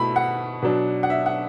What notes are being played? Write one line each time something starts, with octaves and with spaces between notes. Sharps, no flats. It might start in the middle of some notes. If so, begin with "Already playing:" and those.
Already playing: B2 A3 E4 B5
F#5
B2 F#3 D4
F#5
E5
F#5